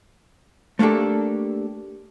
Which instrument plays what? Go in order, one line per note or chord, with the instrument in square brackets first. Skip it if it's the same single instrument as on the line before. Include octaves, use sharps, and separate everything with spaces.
[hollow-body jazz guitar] A3 A#3 D4 G4 A4